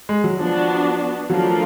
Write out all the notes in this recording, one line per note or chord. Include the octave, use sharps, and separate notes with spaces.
G#3
F#3
F3 B3 D4 F#4
F3 F#3 A3 D4 F4 A#4